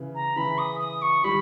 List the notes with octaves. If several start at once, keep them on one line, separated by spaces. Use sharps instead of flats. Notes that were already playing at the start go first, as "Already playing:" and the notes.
Already playing: C#3 E3
A#5
C#3 E3 B5
D#6
D#6
C#6
D#3 G3 B5